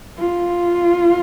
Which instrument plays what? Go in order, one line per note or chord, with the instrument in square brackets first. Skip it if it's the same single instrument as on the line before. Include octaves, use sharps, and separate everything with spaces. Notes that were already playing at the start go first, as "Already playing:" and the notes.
[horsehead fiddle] F4